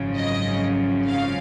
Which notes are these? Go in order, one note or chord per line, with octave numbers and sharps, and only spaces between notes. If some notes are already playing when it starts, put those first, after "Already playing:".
Already playing: G#1 F#2 C#3 F3
D#5
F5